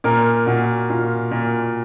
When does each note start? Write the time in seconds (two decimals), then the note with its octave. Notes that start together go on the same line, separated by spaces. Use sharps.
0.04 A#2 A#4
0.46 A#2 F#4
0.90 A#2 F4
1.31 A#2